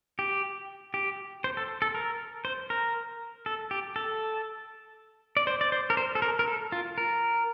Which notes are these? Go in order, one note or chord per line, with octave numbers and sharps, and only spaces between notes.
G4
G4
C5
A4
A4
A#4
C5
A#4
A4
G4
A4
D5
C5
D5
C5
A#4
C5
A4
A#4
A#4
A4
F4
A#4